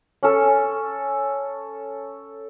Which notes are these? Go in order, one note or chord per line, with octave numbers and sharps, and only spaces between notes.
C#4 A4